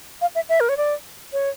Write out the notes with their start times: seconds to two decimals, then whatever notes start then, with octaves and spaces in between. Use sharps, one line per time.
0.21 F5
0.35 E5
0.49 E5
0.60 A#4
0.69 C#5
0.77 D5
1.33 C#5